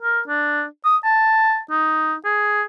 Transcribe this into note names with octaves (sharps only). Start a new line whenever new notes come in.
A#4
D4
D#6
A5
D#4
G#4